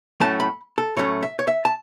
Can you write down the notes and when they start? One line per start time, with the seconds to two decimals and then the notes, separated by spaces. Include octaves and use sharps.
0.20 A2 F#3 A3 C#4 A5
0.40 B5
0.78 A4
0.97 A2 F#3 A3 C#4 C#5
1.22 E5
1.39 C#5
1.47 E5
1.65 A5